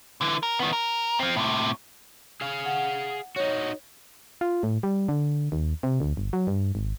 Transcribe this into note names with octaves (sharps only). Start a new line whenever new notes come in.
D3 E3
A#4
D#3 B3
A#4
F3 C4
A2 C3
G#4 F5
F#5
D#4 F#4 C#5
F4
A2
G3
D3
D#2
C3
D2
G1
F#3
G2
G#1